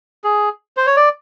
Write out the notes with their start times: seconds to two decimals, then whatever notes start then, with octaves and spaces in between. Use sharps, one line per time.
0.24 G#4
0.77 C5
0.87 C#5
0.97 D5